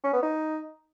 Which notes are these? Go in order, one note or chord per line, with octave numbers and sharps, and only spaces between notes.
C#4
B3
D#4